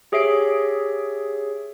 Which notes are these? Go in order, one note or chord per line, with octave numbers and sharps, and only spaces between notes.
G4 G#4 C#5 E5 C7 D7